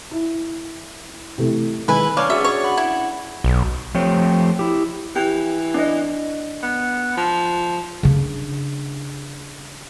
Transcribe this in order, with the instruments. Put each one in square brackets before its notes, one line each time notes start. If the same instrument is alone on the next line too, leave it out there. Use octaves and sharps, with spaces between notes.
[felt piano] E4
C3 E3 A3
[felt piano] D#3 G#3 [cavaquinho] E4 B4 G#5
[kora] C#4 D4 [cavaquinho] F5
[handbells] F#4 G#4 D5 [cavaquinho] E5
[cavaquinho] C#5
[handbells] F#5 B5
[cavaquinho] E4
[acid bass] B1
[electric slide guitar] F3 A3 C4 G4 C#5
E4 G4
[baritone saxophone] E3 [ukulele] G4
[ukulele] D4 D#5
[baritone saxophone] B3
F3
[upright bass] C#3 D4